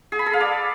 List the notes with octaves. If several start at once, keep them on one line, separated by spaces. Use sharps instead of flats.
G#4
B5
A4
F5
D5